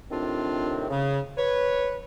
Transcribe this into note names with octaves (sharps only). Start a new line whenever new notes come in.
A2 C3 D#3 C4 D4 F4
C#3
B4 C#5